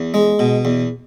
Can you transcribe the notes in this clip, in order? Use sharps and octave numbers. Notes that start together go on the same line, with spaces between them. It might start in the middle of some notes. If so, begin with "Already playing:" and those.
Already playing: E2
G#3
B2
E2